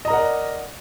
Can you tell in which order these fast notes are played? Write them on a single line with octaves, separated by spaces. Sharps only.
D#5 A#5 A#4 F#5 D5